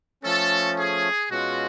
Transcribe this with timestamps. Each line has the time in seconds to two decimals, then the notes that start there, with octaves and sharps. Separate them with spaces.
0.22 F3 A3 C#4 A4
0.77 G#4
1.30 B2 G#3 C#4 F4 F#4 G#4